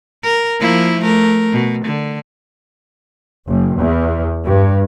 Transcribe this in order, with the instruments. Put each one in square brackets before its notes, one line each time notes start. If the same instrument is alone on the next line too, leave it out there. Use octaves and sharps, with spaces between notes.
[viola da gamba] A#4
F3 A#3 E4
A3 A#4
B2
D3
[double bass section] F#1
E2
G2